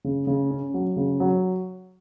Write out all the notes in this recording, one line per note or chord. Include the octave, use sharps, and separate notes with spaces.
C#3
C#3
C#4
F#3
C#3
F#3